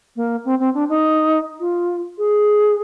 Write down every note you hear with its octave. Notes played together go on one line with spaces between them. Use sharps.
A#3
C4
C4
D4
D#4
F4
G#4